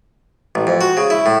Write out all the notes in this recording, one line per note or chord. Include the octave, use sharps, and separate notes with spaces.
A1
F2
F#4
C#3
E4
A2